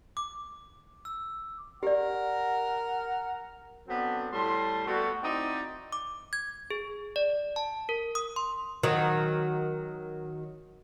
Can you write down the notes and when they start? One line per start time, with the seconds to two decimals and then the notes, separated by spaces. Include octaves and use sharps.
0.17 D6
1.05 E6
1.83 G4 A#4 D5 F#5
3.88 F#3 B3 C4 D4 A4
4.33 A2 G3 A5 C6
4.86 G3 A3 B3 F#4
5.23 C4 D#4 E4 F#4 C5 D5
5.92 D6
6.33 G#6
6.70 G#4
7.16 D5
7.56 A5
7.89 A#4
8.15 D#6
8.36 C6
8.83 D#3 F#3